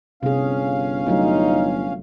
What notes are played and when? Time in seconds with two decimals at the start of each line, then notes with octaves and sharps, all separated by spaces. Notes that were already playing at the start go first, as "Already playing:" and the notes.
0.23 G1 C3 C#4 G#4 F5
1.07 G1 F#3 A3 D#4 F4